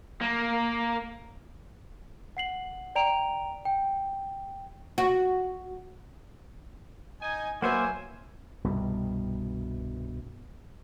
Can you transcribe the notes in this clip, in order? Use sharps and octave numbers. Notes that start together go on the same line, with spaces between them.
A#3
F#5 C7 F#7
D5 G5 A#5 D7 F7
G5
F#4
D#4 G#5
F#3 A#3 B4 C5 E5 F#5 G#5
C2 G2 B2